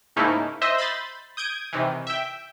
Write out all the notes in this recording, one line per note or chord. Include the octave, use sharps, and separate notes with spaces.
G#2 C#3 A3 A#3 D#4 E4
C5 D#5 E5
B5 C6 G6 A6
D#6 G6 G#6 D7
C3 D#3 E3
E5 G5